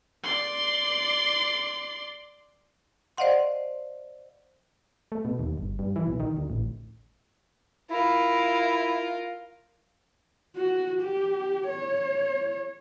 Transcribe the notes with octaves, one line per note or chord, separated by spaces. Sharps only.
D5 C6
C5 D5 D#5 F5 F#5 C6
A3
B2
D#2
G1
G2
E3
B1
D#3
D2
A1
E4 F4 A#4
F#4
G4
C#5